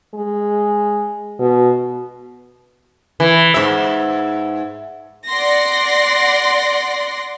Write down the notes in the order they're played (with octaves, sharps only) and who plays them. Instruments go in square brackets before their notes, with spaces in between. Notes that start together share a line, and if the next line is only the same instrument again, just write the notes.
[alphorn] G#3
B2
[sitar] E3
G#2 E5
[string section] D5 F#5 C6 A#6